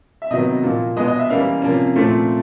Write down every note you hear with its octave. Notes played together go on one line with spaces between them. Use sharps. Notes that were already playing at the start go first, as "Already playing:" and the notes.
E5
C3 D#3 F#3 B3 D#5
A#2 F3 A#3
B2 G#3 B3 D#5
D#5
E5
E3 G3 A#3 C#4 F5
C3 F3 A#3 C#4
A#2 F3 A3 C4